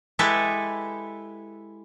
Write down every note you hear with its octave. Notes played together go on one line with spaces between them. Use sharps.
G#3 E4 G4 A4 B4